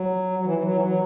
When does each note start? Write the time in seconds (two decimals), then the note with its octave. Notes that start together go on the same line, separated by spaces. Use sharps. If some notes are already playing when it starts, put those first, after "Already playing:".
Already playing: F#3
0.39 F#3
0.45 E3
0.58 E3
0.63 F#3
0.75 E3
0.81 F#3